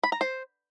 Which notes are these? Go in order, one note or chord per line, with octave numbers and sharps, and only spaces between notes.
B5
A#5
C5